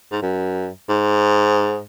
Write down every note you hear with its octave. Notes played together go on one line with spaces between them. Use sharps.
G#2
F#2
G#2